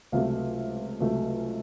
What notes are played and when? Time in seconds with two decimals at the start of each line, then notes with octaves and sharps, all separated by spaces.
0.12 C#2 C3 F#3 A3 F5
1.00 C#2 C3 F#3 A3